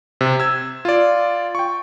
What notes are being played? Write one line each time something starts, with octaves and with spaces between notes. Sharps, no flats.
C3
E6 G#6
F4 D5
G5 C#6